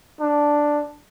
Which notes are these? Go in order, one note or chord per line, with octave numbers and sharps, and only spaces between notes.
D4